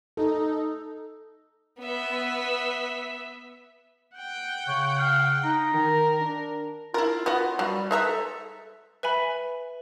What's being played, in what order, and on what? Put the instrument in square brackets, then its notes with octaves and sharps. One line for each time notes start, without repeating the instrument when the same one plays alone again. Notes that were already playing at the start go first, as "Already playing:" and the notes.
[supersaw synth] D#4 [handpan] A4
[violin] B3 E5
[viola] F#5 G5
[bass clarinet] C#3 [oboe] C#5
[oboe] F5
[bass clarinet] D#4 [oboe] A#5
[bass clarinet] D#3 [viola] A#4
[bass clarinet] D4
[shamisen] E4 A#4 [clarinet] F4
[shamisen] B3 F#4
[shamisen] F#3 [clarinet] G3
[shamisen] G#3 E5 A#5 [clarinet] B4
[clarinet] A4
[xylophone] B4 E5 G#5 B5